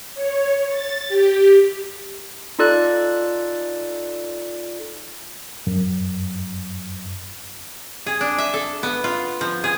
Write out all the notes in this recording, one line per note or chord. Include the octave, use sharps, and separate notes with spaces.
C#5
A6
G4
D#4 F4 A4 D5 F#6
F#2
G#4
D4
E5
A4
B3
F4
F3
G#4